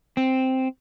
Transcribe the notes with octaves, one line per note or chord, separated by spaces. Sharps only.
C4